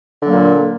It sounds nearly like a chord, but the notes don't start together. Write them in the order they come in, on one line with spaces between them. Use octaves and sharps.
D3 F#3 A#3 A#2